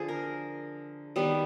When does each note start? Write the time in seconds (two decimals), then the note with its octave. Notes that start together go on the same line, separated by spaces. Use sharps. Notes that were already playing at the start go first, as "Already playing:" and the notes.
Already playing: D3 F3 G#4
0.08 A#4
1.16 D#3 G3 B3